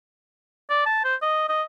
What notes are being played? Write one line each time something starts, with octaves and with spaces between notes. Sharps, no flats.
D5
A5
C5
D#5
D#5